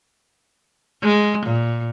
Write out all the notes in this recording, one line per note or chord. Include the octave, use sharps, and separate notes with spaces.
G#3
A#2